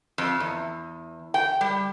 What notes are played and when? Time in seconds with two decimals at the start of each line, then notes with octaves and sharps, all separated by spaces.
0.18 F2
0.40 E2
1.34 G5
1.61 G3